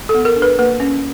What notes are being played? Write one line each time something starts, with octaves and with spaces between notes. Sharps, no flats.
A4
B3
A#4
D4
B4
A#3 B4
C#4